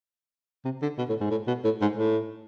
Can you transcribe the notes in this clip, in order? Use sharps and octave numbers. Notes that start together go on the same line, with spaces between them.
C3
D3
B2
A2
G#2
A2
B2
A2
G#2
A2